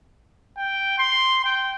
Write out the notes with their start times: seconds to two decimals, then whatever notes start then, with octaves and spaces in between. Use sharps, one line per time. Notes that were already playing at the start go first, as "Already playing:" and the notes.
0.57 G5
0.98 C6
1.44 G5